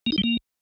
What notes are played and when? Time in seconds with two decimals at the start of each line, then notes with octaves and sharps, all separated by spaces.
0.06 A#3
0.12 D#4
0.18 G3
0.24 A#3